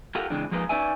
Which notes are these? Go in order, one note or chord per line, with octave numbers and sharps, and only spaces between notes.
F4 G4 A4 A#4 F5 F#5
C#3 E3 G#3 C4 D4
F3 G#3 A#3 D#4 B4
C#4 D#4 B4 D5 E5 G#5